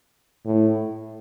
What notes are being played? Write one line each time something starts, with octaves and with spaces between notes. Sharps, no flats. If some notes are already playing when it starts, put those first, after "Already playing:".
A2